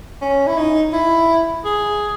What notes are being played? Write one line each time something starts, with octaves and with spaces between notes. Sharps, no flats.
C#4
E4
D#4
E4
G#4